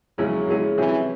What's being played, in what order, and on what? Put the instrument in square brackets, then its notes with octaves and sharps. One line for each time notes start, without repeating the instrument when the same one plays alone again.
[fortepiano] E2 C#3 G#3 C#4 E4 [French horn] F#3
[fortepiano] E2 C#3 G#3 C#4 E4
[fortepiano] C3 F#3 C#4 G#4 [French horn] E3